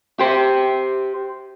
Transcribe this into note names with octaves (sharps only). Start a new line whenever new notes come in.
G4 C5